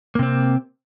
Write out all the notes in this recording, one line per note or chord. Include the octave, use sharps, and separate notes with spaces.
C3 A#3 C4